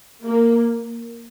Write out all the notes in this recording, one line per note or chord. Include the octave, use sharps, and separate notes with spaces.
A#3